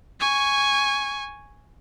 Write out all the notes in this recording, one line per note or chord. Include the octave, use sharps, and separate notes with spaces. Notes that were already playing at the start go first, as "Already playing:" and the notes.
G#5 C#6